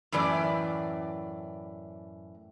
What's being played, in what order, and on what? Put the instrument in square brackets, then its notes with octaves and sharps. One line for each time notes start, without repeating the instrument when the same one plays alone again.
[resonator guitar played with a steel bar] F#2 A2 E3 D5